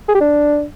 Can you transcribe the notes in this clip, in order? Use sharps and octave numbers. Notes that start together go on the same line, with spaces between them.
G#4
G4
D4